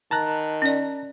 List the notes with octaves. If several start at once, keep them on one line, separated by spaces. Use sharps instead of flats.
D#3 A5 A#5 F#6
C#4 D5